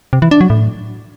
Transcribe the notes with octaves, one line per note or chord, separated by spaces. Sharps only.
C3
E3
D4
F#3
A2